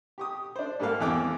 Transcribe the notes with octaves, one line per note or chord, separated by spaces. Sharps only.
G4 C#6 D#6
D4 C5
G#2 G3 A#3 A4 F5
E2 E3 A3 C4 G5 D6